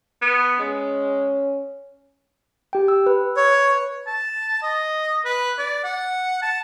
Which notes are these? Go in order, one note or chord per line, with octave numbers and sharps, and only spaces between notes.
B3
G#3 C#4
G4 G5
E6
B4
C#5
A5
D#5
B4
D5
F#5
A5